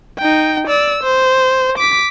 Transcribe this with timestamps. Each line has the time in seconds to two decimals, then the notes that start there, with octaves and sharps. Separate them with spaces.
0.19 D#4 G5
0.67 D5 E6
1.04 C5
1.78 D6 B6